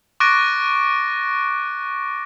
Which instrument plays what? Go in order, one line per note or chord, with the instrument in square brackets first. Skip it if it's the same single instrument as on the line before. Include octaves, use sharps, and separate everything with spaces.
[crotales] C#6 D6 F#6 A6 A#6 D7